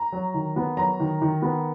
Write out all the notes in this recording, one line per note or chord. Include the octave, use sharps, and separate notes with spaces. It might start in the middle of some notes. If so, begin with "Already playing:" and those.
Already playing: A#5
F#3
D#3
B3
F#3 A#5
D#3
D#3
B3